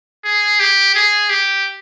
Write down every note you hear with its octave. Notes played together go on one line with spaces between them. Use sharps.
G#4
G4
G#4
G4